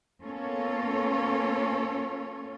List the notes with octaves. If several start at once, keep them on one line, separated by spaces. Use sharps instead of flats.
A#3 B3 C#4 F4 A4 C#5